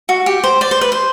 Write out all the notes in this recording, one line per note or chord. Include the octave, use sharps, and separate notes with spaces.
F#4
G4
C5
D5
C5
B4
C5